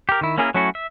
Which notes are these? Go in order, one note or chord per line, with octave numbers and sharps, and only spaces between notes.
G4 A#4
D#3 E4
A#3 C#4 E4 G#4 A#4
F#3 A3 C#4 E4 F#4
E5